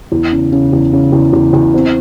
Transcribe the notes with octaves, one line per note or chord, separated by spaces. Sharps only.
E2
C#3
C#3
E2
C#3
E2
E2
E2
C4